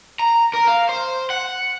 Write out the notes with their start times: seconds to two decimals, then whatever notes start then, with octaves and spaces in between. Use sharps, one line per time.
0.19 A#5
0.54 A#4
0.67 F5
0.89 C5
1.30 F#5